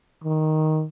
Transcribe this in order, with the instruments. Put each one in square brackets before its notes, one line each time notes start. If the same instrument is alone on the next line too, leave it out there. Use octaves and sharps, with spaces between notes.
[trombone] D#3